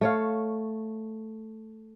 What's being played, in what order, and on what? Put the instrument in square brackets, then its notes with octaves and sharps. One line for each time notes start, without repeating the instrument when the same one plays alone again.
[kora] A3 C#5 F5